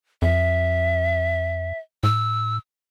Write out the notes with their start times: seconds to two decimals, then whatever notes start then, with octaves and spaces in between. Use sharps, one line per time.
0.22 F2 E5
2.03 A2 E6